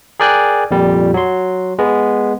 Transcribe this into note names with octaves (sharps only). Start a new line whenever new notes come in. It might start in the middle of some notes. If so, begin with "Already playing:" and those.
G#4 A#4 D5 G5 G#5 F#6
F2 A#2 G3
F#3 C6
G#3 B3